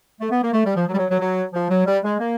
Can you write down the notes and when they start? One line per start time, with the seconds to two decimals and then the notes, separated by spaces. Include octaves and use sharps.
0.20 A3
0.31 B3
0.43 A#3
0.53 A3
0.65 G3
0.75 F3
0.87 F#3
0.93 G3
0.98 F#3
1.09 F#3
1.19 F#3
1.53 F3
1.69 F#3
1.86 G3
2.03 G#3
2.19 A#3